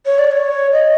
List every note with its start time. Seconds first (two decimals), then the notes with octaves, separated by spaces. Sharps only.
0.06 C#5
0.19 D5
0.31 C#5
0.72 D#5